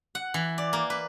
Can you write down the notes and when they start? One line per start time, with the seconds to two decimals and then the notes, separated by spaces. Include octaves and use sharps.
0.15 F#5
0.34 E3
0.58 D5
0.73 A#3
0.90 B4